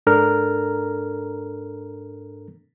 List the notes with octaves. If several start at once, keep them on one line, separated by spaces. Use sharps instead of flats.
G#2 D4 A4 A#4 A#5 F6